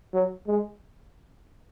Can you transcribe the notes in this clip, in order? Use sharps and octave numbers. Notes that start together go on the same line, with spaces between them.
F#3
G#3